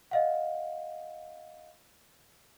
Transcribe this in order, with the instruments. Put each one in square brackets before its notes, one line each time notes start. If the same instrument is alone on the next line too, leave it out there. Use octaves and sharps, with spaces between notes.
[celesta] D#5 F5 F#5